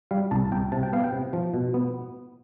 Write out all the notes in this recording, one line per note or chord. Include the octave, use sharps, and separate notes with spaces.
G3 F5
C2 A5
C2 G5
C3 A5
G5
B3 F5
G5
C3
F3
B2
B3